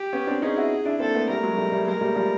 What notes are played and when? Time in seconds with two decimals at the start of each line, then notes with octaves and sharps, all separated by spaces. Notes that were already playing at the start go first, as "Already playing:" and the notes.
Already playing: G4
0.13 B3 C#4
0.27 C4 D4
0.42 C#4 D#4 G#4
0.57 E4 F#4
0.85 D4 E4
0.99 A#3 C4 A4
1.14 A3 B3
1.29 G3 A3 A#4
1.43 F#3 G#3
1.57 G3 A3
1.72 G3 A3
1.87 G#3 A#3 A#4
2.01 G3 A3
2.15 F3 G3